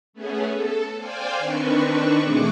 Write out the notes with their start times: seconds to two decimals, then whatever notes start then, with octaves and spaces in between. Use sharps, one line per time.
0.13 A3 B3 C#4 G#4
0.45 A4
0.97 C5 D5 F5 G5 G#5
1.38 D#3 C4 D4 B4 C#6
2.21 B2 E3 A3 G#4 C#6 D6